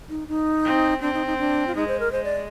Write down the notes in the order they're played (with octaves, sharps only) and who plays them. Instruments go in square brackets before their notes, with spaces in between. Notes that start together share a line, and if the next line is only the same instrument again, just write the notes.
[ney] D#4
D#4
[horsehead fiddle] C4
[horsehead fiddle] C4 [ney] D4
[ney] D#4
D#4
D4
F4
[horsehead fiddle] G#3 [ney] D#4
[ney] C5
A#4
[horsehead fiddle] G#3 [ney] C5
[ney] D5